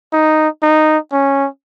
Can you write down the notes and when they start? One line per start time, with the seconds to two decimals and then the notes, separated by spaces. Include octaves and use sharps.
0.13 D#4
0.62 D#4
1.12 C#4